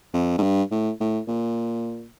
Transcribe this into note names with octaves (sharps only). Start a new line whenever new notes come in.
F2
G#2
G2
A2
A2
A#2